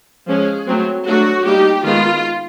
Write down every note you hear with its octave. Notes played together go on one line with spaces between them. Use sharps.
F3 G#3 C#4 G#4
F#3 A3 C4
F#3 A3 D4 F#4
G3 A#3 D#4 G4
D#3 G#3 B3 F4